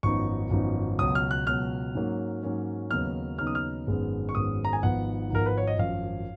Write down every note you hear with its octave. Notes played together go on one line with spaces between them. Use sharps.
G#1 F#2 F3 B3 D#4 C#6
G#1 F#2 F3 B3 D#4
C#2 B2 F#3 D#6
F6
F#6
C#2 B2 F#3 F6
G#2 F#3 A#3 C#4
G#2 F#3 A#3 C#4
D#2 C#3 F#3 B3 D#4 F6
D#2 C#3 F#3 B3 D#4 F6
D#6
F6
G#1 F#2 D#3 G#3 B3
C#6
G#1 F#2 D#3 G#3 B3 D#6
A#5
G#5
G#1 G#2 F3 B3 D#4 F#5
G#1 G#2 F3 B3 D#4 A#4
B4
C#5
D#5
G#1 F#2 F3 F5